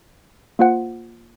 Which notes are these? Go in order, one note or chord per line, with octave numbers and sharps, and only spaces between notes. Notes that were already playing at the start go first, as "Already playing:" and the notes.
A#3 F4 C5 F#5